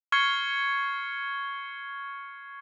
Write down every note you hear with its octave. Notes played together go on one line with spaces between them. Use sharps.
C#6 F6 G#6 C7 C#7 G7